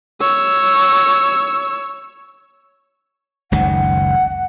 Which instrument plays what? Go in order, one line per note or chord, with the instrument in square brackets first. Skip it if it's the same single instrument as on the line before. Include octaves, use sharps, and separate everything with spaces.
[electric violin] C#5 E6
[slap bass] F#1 C#2 D#3 [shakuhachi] F#5